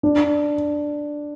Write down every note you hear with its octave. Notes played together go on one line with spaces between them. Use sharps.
D4